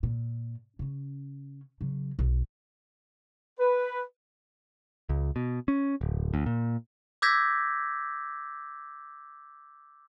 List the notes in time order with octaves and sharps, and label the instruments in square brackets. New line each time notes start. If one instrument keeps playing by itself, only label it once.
[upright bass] A#2
C#3 C#4
C#3 F#3
B1
[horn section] B4
[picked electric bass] C#2
B2
C#4
D1
D2
A#2
[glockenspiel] D6 E6 G6 G#6 A#6 B6